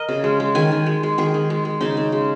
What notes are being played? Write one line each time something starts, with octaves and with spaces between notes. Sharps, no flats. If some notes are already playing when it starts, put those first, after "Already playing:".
Already playing: A#4 D#5
C#3
G#3
G#3
D#3 G#5
D#3
G#3
G#3
D#3 G#4
D#3
G#3
G#3
C#3 D#4
C#3
G#3